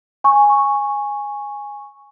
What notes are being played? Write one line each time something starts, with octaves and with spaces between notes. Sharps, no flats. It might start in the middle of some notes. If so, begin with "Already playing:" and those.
G#5 C#6